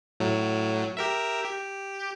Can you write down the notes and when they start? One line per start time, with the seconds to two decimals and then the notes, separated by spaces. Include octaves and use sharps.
0.20 A2 F#3
0.97 G4 A#4 E5
1.45 G4